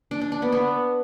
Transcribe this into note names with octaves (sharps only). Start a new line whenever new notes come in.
D4
D4
D4
B3
B3